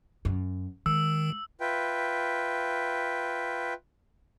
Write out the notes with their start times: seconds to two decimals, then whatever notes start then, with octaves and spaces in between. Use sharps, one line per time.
0.25 F#2
0.86 D#3 G#3 E6
1.61 F4 B4 E5 G5